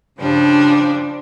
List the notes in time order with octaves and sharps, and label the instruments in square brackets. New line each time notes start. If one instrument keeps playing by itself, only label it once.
[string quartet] G2 C#3 F3 G3 D4